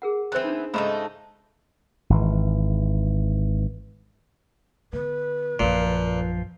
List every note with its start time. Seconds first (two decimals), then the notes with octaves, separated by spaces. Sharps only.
0.02 G#4 A#4 F#5
0.32 E3 B3 C4 E6 F#6
0.44 D4 D#4
0.74 G#2 C#3 F3 A3 D#4 E5 A#5 B5
2.10 G#1 E3
4.93 D3 B3 B4
5.59 A#1 F#2 A#2 F3 F4